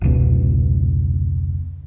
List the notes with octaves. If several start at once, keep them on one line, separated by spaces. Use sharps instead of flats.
F1 C#2 B2